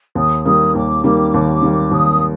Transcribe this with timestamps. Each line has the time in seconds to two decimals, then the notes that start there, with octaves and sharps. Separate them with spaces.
0.15 D#2 D#6
0.45 D#3 G3 A#3 D#6
0.75 D#2 D6
1.04 D#3 G3 A#3
1.34 D#2
1.62 D#3 G3 A#3
1.92 D#2 D#6